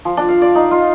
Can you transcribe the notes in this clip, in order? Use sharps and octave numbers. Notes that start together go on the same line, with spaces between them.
F3
D4
F5
D5
D#4
F4